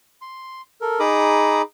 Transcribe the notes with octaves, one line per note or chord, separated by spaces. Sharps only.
C6
A4 A#4
D#4 G#4 A#5 B5 D6 D#6